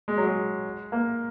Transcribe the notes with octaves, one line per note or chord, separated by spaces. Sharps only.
G#3
F#3
G#3
A#3